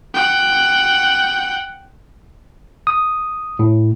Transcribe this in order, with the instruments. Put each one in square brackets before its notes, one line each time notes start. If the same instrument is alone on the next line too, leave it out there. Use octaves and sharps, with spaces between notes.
[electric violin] F#5 G5
[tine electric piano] D#6
A2